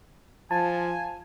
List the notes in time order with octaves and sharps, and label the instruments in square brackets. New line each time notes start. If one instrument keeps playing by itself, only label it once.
[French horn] F3 [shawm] G#5 [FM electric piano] A5